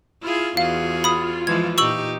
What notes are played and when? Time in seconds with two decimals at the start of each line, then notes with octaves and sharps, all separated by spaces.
0.22 E4 F4 G#4
0.57 E2 F4 F#4 G#4 F5
1.04 B5 D#6
1.47 E3 F3 G#3 G#6
1.78 A#2 D#4 G4 C#6 E6 F#7